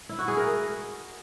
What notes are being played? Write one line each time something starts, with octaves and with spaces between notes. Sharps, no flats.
E4
F#4
G#4
A#4